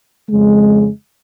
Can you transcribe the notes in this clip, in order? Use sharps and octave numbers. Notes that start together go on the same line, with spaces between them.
F2 C#3 G#3